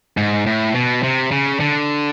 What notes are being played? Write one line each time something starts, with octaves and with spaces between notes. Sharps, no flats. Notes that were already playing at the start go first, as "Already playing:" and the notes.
G#2
A2
B2
C3
C#3
D3